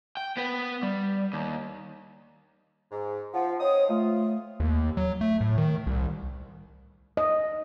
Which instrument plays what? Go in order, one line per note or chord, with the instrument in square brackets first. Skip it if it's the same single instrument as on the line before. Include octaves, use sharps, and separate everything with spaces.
[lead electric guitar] G5
B3 B4
G3
D#2
[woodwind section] G#2
[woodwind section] F3 [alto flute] F#5
[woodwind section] C4 D#4 D#6 [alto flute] C#5
[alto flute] A3 [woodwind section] F4
[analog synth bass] D#2
F#3
A3
A2
D#3
C2
[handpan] D#5